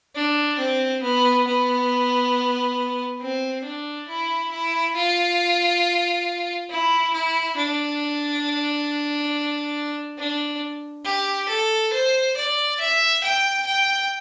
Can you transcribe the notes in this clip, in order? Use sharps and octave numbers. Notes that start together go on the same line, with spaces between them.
D4
C4
B3
B3
C4
D4
E4
E4
F4
E4
E4
D4
D4
G4
A4
C5
D5
E5
G5
G5